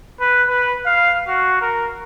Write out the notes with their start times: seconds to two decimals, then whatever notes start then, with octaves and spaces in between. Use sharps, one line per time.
0.20 B4
0.49 B4
0.86 F5
1.28 F#4
1.61 A#4